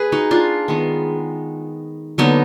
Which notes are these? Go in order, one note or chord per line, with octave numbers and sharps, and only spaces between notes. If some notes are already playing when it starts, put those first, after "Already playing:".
Already playing: G#4 B4
D#4 F#4
D4 F4
D#3 G#3 B3
D3 F#3 A#3 B3 D#4